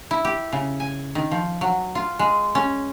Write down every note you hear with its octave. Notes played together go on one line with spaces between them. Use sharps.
E4
G4
C#3
G#5
D#3
F3
F#3
F4
G#3
C#4